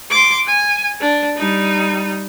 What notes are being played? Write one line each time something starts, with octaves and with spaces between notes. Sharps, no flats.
C6 D6
G#5
D4
G3 D#4